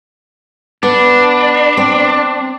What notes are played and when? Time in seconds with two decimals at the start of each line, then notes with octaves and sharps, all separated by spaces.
0.83 B3 D4
1.77 C4